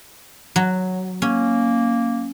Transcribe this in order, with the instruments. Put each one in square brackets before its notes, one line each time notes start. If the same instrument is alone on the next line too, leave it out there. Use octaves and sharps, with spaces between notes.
[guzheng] F#3
[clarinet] A#3 [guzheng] C#4